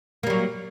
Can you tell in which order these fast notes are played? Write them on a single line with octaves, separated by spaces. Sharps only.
A#3 G3 F#3